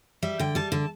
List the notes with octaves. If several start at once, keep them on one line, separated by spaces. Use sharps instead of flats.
G3 E5
D3 G5
G3 A5
D3 A5